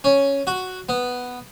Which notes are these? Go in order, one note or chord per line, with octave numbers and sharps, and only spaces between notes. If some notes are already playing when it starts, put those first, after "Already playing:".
C#4
F#4
B3